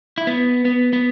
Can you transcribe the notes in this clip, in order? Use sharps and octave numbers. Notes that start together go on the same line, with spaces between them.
E4
B3
B3
B3